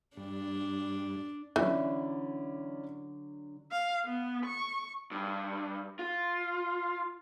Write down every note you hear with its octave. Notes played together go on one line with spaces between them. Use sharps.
G2 D4
D3 E3 F#3 C#4 E4 D5
F5
B3
C#6
G2
F4